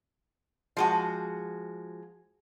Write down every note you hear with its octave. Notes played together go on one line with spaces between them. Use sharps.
F3 G#3 F#4